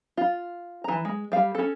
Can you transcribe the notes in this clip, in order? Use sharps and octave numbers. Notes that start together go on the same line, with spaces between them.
F4
E3 A#5
G#3
G3 F5
C#4 A4